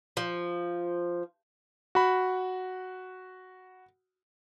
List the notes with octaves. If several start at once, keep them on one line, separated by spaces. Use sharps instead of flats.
F3
F#4 B5